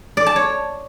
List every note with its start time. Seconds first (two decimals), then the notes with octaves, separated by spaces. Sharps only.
0.17 D5
0.26 A5
0.36 C#5